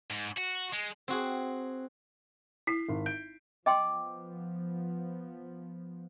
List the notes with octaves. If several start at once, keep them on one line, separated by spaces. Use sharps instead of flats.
G#2
F#4
G#3
C4 F#4 G#4
E4 B6 C7
G#1
G6 D7
F3 B3 D#5 G5 C6 D6